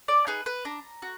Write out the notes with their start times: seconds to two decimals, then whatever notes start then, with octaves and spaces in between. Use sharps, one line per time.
0.08 D5
0.27 D#4 G#4 B4
0.46 B4
0.65 D4 A#5
1.02 F#4